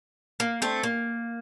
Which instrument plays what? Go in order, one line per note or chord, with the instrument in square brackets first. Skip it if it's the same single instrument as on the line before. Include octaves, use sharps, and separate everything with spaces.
[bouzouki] A#3
A3 C4
A#3